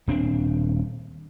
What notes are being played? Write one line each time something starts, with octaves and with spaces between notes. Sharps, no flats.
D#1 C4 D4